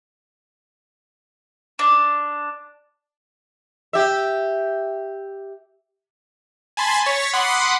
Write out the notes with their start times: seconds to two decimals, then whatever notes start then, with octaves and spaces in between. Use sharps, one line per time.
1.79 D4
3.93 G4 E5
6.77 G#5 A5 B5 C6 A6
7.06 C#5 C#6 A6 B6
7.33 F#5 B5 C6 D6 D#6